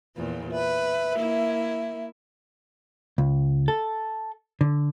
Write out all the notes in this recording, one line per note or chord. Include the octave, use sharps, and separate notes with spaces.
E2 A#2 F3
B4 E5
A#3 E4
C#2
A4
D3